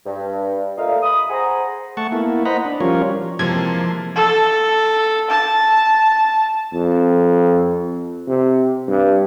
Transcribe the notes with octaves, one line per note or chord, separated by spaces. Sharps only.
G2
A#2 A3 D#5 F5
D#5 B5 D#6
G#4 C5 F#5 G#5 A#5
A3 F#5 A5 C#6
A#3 B3 E4
C5 D#5 F#5 A#5 B5
D4
F3 G3 C#4 F4 A#4 C#5
C3 E3 F3 G#3 A#3 A5 C6 G#6
A4
A5
F2
C3
G2